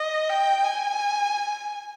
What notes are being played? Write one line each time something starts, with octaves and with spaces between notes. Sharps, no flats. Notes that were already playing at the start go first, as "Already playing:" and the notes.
Already playing: D#5
G5
G#5